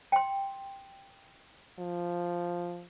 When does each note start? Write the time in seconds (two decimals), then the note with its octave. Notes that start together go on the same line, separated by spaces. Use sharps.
0.12 G5 C6
1.79 F3